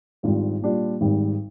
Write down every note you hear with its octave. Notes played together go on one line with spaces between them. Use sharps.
G#1 G#2 G3 D4 F4
A#2 G3 D4 F4
G#1 G#2 D#3 G3